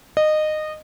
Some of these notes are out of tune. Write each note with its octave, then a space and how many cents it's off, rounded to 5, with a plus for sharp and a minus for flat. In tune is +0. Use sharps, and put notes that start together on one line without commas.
D#5 -20